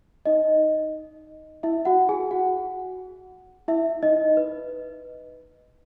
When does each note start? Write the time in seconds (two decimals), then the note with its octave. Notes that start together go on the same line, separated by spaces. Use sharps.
0.26 D#4 D#5
1.63 E4 E5
1.85 F#4 F#5
2.09 G#4 G#5
2.31 F#4 F#5
3.68 E4 E5
4.03 D#4 D#5
4.37 B4